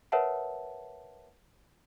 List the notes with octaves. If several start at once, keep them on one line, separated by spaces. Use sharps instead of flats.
A#4 B4 C#5 E5 F#5 A5